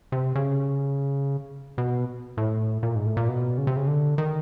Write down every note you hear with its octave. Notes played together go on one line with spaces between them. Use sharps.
C3
C#3
B2
A2
A#2
G#2
A2
A#2
B2
C#3
C3
C#3
D3
D#3